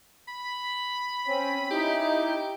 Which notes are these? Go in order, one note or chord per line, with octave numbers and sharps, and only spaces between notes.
B5
C4 C#4
D#4 E4 G4